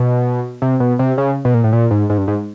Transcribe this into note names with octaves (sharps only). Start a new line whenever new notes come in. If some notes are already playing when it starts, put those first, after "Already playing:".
Already playing: B2
C3
B2
C3
C#3
B2
A#2
A2
A#2
G#2
G#2
G2
G#2